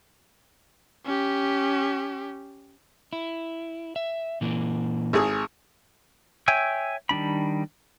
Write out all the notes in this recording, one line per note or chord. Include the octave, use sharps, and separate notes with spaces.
C#4 G4
E4
E5
A#2 E3 A#3
G#1 G#4 D#6
C#5 E5 G5 G#5 E6
D#3 G3 D4 B5